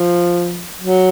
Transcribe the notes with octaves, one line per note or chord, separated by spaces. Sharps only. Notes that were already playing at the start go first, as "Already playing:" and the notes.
Already playing: F3
F#3